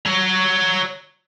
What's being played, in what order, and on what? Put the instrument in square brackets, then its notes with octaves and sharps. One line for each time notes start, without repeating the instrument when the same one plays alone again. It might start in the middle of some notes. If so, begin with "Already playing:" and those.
[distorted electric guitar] C#5 A#5